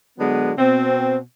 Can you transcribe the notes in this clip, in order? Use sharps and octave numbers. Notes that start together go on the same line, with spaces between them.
D3 F#3 G#3 B3
B2 C4